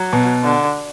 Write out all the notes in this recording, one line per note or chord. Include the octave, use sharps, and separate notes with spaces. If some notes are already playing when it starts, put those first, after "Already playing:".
Already playing: F#3
B2
D3